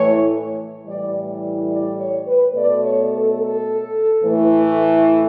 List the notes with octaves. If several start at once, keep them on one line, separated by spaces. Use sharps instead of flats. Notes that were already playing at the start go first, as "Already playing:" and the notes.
Already playing: A2 E3 A3 C#5
A2 E3 G3 D5
D5
C#5
B4
B2 A3 D5
C#5
A4
A4
A2 E3 A3